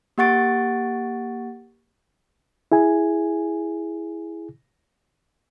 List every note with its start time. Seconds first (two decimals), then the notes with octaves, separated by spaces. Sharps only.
0.18 A#3 G4 F#5 C#6 A6 D7
2.72 E4 G#4 G#5